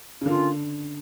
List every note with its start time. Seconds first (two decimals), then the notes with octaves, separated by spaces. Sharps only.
0.21 C#3
0.26 D3 A#3 C#4 F4